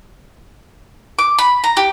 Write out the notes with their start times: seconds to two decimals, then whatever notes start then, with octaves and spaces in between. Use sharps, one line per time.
1.19 D6
1.39 B5
1.64 A#5
1.77 G4